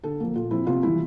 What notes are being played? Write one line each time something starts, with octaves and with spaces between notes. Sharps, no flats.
D3 A4
F3 A#3
A#2 F4
F3 C4 E4
C3 F4
E3 G3 E4